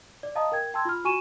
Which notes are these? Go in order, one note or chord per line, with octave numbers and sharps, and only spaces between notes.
D5
D#5 F5 A5 A#5 D#6
A#4 G5 G#6
G5 A5 C6 E6 G#6
F4 B5 F6
F#4 G#5 C#6 D#7 E7